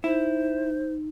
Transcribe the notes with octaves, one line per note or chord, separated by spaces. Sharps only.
D#4 E4 C5